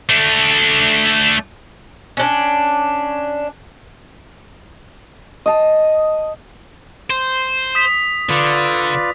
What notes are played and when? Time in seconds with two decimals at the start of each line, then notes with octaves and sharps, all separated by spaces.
0.09 A3 D4
2.17 C#4 D4
5.46 D#5 A5
7.10 C5
7.75 D#6 B6
8.29 D3 F4 B4 D5